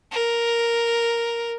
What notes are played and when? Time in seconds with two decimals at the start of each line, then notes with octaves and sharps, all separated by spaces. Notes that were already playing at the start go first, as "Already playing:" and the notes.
0.11 A#4